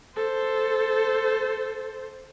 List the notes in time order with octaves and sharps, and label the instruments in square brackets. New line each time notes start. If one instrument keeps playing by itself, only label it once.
[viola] A4 C5